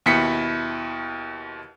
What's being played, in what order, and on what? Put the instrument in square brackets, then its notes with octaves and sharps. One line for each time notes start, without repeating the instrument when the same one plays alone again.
[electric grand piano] D#2 B2 E4 B6 C#7